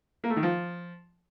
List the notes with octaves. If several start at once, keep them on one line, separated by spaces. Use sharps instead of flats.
A#3
A3
D#3
F3